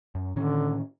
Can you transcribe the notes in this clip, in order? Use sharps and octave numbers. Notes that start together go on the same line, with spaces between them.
F#2
A2 D3 D#3 C#4